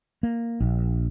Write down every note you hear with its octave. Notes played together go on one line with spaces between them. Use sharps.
A#3
A#1